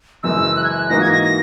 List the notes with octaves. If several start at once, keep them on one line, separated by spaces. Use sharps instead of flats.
F#1 F#2 E3 G#3 E6
F#6
G#6
F#6
G#2 E3 A#3 D#4 F#4 A#6
G#6
A#6
A#6